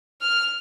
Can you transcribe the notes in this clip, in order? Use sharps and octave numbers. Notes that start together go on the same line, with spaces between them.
F6